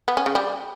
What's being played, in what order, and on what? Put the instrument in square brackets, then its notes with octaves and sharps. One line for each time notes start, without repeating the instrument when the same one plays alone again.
[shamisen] B3
C#4
C#3
G3